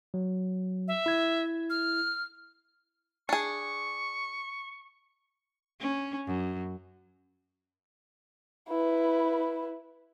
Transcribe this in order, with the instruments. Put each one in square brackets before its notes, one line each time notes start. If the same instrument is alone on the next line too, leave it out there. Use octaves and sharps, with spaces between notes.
[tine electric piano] F#3
[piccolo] E5
[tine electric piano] E4 G#6
[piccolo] F6
[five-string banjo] D4 G#4 [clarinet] C#6
[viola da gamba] C#4
F#2
[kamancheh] E4 B4